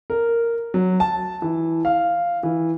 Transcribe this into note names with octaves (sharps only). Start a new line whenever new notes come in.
A#4
F#3
A5
E3
F5
E3